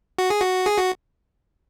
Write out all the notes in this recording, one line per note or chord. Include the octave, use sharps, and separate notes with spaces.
F#4
G#4
F#4
G#4
F#4